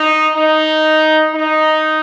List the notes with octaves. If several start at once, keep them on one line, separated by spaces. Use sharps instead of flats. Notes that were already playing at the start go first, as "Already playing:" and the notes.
Already playing: D#4
D#4
D#4